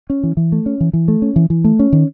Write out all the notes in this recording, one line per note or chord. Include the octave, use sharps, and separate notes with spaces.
C#4
E3
E3
A3
C#4
E3
E3
A3
C#4
E3
E3
A3
C#4
D#3